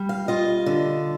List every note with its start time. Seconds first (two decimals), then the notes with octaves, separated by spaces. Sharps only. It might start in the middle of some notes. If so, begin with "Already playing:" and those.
Already playing: G3
0.09 F5
0.28 F4 D#5
0.66 D3